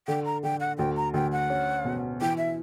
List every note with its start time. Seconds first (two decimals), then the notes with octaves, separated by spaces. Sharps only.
0.08 D3 G5
0.25 A#5
0.43 D3 G5
0.60 F#5
0.78 D2 G5
0.97 A#5
1.14 D2 G5
1.32 F#5
1.50 C#4
1.85 B2
2.21 E3 G5
2.38 E5